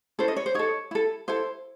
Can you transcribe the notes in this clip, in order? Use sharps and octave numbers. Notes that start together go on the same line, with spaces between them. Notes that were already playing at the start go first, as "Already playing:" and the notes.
C#4 E4 A4 C5
D#5
C#5
C5
D#4 A4 C#5
E4 A4
E4 A4 C5